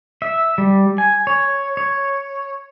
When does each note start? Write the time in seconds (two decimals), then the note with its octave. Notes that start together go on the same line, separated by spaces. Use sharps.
0.22 E5
0.58 G3
0.98 G#5
1.27 C#5
1.77 C#5